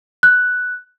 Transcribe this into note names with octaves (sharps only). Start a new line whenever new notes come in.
F#6